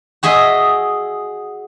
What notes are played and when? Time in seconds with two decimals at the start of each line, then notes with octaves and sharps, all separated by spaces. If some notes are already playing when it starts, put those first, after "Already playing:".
0.23 F#4 G#4 D#5 E5